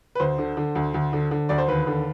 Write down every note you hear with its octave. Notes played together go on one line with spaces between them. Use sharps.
B4
D2 C5
D3
D3
D2
D2
D3
D3
D2 D5
C5
D#2 B4
D3